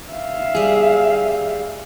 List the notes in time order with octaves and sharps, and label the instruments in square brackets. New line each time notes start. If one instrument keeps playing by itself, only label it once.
[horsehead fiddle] E5 F5
[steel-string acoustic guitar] G3 G#4